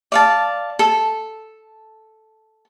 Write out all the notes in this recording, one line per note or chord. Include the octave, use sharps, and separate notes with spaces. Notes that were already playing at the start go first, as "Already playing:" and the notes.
D5 F5 A5
A4